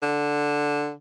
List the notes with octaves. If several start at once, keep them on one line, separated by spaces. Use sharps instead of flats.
D3